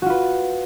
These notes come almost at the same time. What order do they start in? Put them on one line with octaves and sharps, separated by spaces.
F#4 F4 B4